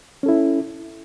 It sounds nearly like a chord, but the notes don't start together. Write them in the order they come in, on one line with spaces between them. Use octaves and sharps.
C#4 A4 E4